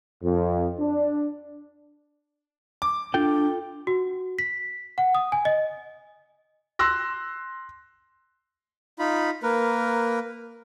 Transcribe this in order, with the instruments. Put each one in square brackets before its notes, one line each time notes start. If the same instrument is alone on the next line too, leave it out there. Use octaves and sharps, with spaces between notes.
[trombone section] F2
D4
[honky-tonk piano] D6
[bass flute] D4 [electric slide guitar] F4 A4 G5
[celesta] F#4
B6
F#5
D#6
G#5
D#5
[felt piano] C6 E6 F#6 A#6
[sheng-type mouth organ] D#4 F4 B5
A#3 A#4 B4